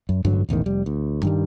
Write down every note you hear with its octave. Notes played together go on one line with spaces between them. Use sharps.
F#2
A1 G2 D3 F#3
E1 A1 E2 D#3
F1 G3
D2
G2 D#3 G3